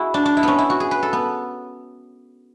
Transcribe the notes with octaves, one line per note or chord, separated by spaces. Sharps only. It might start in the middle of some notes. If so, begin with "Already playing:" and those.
Already playing: E4 F#4 G#4
D4
D4
E4
B3 C#4
E4
F#4
G#4
B4
A4
B3